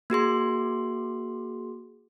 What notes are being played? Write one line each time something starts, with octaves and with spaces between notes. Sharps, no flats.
A#3 F#4 G#4 C6